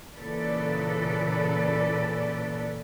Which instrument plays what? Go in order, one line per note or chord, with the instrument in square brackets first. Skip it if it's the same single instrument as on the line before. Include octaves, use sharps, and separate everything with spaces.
[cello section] A#2 C#3 E3 A4 B4 D5